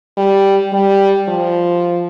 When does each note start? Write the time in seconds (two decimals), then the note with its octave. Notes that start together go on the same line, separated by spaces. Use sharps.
0.17 G3
0.73 G3
1.28 F3